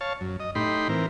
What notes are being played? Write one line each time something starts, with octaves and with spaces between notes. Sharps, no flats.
C#5 F5 A5
F#2
D#5
A2 D#4 G4 B5 C6
E3 C4 A#4